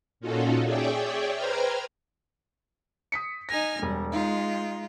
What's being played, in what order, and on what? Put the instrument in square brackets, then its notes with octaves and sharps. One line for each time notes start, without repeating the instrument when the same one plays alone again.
[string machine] A#2 C#4 D#4 F4 F#4 A4
G#4 C#5 D5 E5 G5
B4 C5 G5 A#5 F6 G#6
[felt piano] D#6 B6 C#7
[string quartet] D#4 G#5 F6 [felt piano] A#6
[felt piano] E1 [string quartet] G3
[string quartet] G#3 F4 [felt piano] D#4